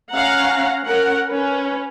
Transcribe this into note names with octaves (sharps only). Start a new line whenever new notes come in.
C#4 F5 F#5 A#5
C#4 A#4 F#5
C#4 B4